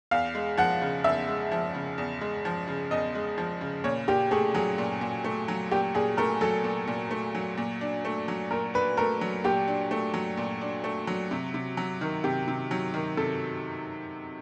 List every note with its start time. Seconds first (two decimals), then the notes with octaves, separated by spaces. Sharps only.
0.11 E2 F5
0.35 G#3
0.58 F3 F#5
0.82 C#3
1.04 E2 E5
1.28 G#3
1.52 F3
1.75 C#3
1.98 E2
2.21 G#3
2.45 F3
2.68 C#3
2.91 E2 D#5
3.15 G#3
3.38 F3
3.61 C#3
3.84 A#2 C#5
4.08 A#2 G4
4.31 A3 G#4
4.55 F#3 G#4
4.78 A#2
5.01 A#2
5.24 A3
5.48 F#3
5.71 A#2 G4
5.95 A#2 G#4
6.17 A3 A#4
6.41 F#3 A4
6.64 A#2
6.87 A#2
7.11 A3
7.35 F#3
7.57 A#2
7.81 D4
8.05 A3
8.28 F#3
8.51 A#2 A#4
8.74 D4 B4
8.97 A3 A#4
9.21 F#3
9.44 A#2 G4
9.68 D4
9.91 A3
10.14 F#3
10.37 A#2
10.61 D4
10.84 A3
11.07 F#3
11.31 C3
11.54 C3
11.77 F#3
12.01 D#3
12.24 C3 G4
12.48 C3
12.71 F#3
12.94 D#3
13.17 C3 A4